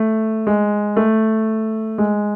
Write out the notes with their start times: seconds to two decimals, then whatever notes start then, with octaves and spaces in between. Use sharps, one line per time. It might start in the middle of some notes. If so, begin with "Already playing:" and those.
Already playing: A3
0.47 G#3
0.97 A3
1.98 G#3